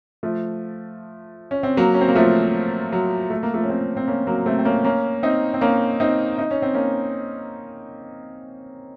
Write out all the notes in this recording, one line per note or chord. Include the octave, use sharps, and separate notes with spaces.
F3 A3
C#4
C4
F#3 A#3
C#4
C4
A#3
F3 A3
F#3
A3
A#3
F3 A3
C#4
A3 C4
C4
A#3 C#4
F#3 A#3
A3 C4
C4
A#3 C#4
A#3 C#4
C4 D#4
C4
A#3 C#4
C4 D#4
D#4
C#4
C4
A#3 C#4